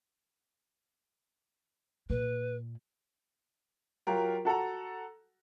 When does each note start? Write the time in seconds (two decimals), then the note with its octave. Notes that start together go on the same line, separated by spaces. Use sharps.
2.10 A#2 B4
4.07 F#3 F4 G4 A#4
4.45 F#4 A4 F#5 A#5